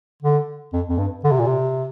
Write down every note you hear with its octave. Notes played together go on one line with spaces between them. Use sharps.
D3
F2
F2
G2
D3
C3
A#2
C3